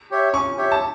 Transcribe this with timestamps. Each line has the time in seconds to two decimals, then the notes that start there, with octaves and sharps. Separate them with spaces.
0.11 G4 C#5 E5
0.33 C#4 C#6
0.57 G4 C#5 E5
0.72 A5